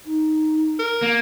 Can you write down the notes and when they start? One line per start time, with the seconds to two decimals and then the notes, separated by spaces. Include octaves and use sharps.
0.06 D#4
0.79 A#4
1.02 A#3